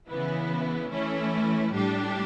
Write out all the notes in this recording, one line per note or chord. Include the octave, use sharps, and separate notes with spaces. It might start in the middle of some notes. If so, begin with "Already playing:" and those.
C#3 E3 B3 E4
E3 A3 C#4 E4
A2 G3 D4 G4